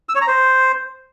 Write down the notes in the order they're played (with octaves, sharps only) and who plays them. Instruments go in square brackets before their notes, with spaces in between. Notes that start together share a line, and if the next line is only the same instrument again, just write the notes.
[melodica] E6
C#5
A#5
C5